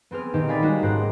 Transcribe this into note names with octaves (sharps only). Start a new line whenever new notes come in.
B3 C4 G#4 F6
A#2 D#3 C4 D#4 G4
D5 D#5 F5 G#5 B5 A6
G3 G#3 A#3 C#4 D#4 F#4
G#1 G#2 G4 C5 F#6 A#6